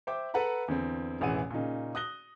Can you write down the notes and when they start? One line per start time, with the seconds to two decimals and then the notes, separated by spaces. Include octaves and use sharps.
0.07 C5 E5 G5 D6
0.34 A4 B4 F#5 A#5 B5
0.68 E2 D3 C4
1.20 E1 A1 E3 G#4 F#5 D#7
1.50 A#2 C#3 D#4
1.95 D#6 F#6 A#6 G7